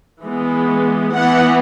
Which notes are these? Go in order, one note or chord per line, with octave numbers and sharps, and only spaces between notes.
E3 G#3 B3
E3 B3 F#5